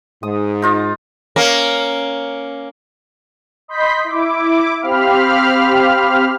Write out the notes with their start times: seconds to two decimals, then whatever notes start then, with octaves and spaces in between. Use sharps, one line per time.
0.23 G#2 D#6
0.62 D#4 F4 D#5
1.36 A#3 C#4
3.68 D#5 B5 C6 G6 B6
4.04 E4 D6
4.81 C4 G4 F5 B5 F6